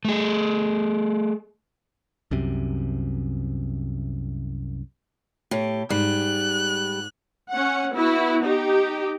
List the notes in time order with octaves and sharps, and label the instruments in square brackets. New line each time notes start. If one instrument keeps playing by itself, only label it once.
[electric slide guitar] A3 G#4
[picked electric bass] C2 F#2 C3
[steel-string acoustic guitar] A2 G4
[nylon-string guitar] G#2 [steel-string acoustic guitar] G3 [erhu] F#6
[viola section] C#4 F#5
B3 E4 F#4
D#4 G4